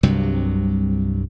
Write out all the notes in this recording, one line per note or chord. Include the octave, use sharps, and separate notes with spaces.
C2 G2 C3 F#3